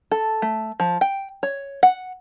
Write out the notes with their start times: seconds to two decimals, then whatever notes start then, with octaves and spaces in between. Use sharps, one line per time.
0.11 A4
0.42 A3
0.80 F3
1.01 G5
1.43 C#5
1.83 F#5